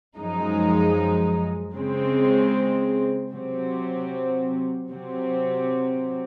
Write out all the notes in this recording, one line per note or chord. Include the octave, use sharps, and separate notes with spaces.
F#2 F3 G#3 D#4
C#3 G#3 C4
C3 F#3 C4
C3 F#3 C4